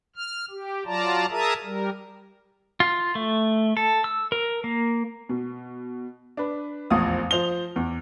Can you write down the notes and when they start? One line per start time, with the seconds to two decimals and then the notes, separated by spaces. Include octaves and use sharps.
0.16 F6
0.50 G4
0.86 F#3 F4 D5 A5 A#5
1.31 G#4 A#4 E5 A5 A#5 D#6
1.64 G3 A#4
2.80 F4
3.15 A3
3.77 A4
4.04 E6
4.32 A#4
4.64 A#3
5.29 B2
6.37 D4 B4
6.90 F1 A#1 E2 F3 F5 D#6
7.31 F3 C5 F7 G7
7.76 E2